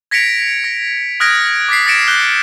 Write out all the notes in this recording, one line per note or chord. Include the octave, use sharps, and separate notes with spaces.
G#6 A#6 B6 C#7 D7 F7
A#6
D#6 F6 F#6 G#6 A#6 D7
D6 A6 B6 C7
D#6 A6 A#6 C#7 D7 E7
F#6 G6 G7